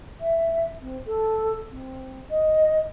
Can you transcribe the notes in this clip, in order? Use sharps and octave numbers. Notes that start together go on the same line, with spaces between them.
E5
C4
A4
C4
D#5